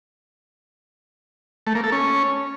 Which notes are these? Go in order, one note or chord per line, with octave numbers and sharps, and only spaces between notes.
A3
A#3
A4
C#4